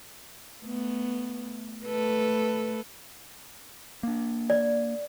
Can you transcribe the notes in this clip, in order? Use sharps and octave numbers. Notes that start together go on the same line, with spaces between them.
A3 B3
A3 A4 B4
A#3 D4
D5